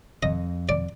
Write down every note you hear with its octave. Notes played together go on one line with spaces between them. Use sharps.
F2 D#5
D5